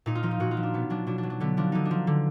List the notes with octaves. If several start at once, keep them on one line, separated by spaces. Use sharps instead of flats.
A#2 D#4
F4
F3 D#4
F4
A#2 F#4
F4
F3
D4
B2 B3
F#3 D4
B2 D4
D4
F#3
D4
D3 B3
F3 D4
D3 D#4
D4
F3
D3